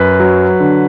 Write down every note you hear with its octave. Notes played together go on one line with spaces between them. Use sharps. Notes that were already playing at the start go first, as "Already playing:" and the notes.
Already playing: F#2 B4
F#3
D3